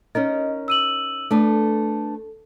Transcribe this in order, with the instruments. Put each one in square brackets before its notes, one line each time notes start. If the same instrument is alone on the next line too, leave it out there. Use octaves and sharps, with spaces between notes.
[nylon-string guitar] C#4 D#4 A#4 [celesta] D#5
[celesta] E6 D#7 F#7
[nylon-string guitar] A3 D4 B4 [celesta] A4